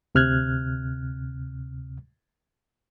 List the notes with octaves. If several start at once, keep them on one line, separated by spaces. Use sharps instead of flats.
D2 C3 F6 F#6 G#6